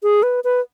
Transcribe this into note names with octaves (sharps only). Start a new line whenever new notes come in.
G#4
B4
B4